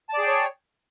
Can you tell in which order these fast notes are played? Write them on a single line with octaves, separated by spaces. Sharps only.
A5 D5 G#4 G5 C#5